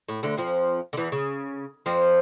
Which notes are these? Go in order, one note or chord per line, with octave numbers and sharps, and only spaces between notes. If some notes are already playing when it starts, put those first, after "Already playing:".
A2
D2 D3
F2 F3
D3
E2 E3
C#3
F2 F3